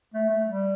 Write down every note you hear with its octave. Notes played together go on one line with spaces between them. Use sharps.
A3
A3
G3